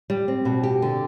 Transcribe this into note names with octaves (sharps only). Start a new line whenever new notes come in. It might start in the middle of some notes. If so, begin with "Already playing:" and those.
G3
C4
B2
G4
D3